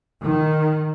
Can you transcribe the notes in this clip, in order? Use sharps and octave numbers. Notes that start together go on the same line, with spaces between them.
D#3